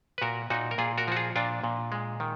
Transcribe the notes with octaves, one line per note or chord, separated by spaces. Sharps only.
B4
A#2 F#4 A#4
A#2 D#4 F#4
A#4
A#2 F4 G#4
F#4 A#4
F3 F#4
F4 G#4
A#2 D4 F4
A#2
G#3
D#3